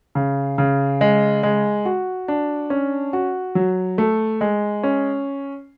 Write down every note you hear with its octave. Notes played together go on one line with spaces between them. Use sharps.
C#3
C#3
G#3
G#3
F#4
D4
C#4
F#4
F#3
A3
G#3
C#4